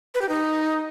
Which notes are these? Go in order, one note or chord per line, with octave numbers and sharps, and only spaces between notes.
B4
G4
D#4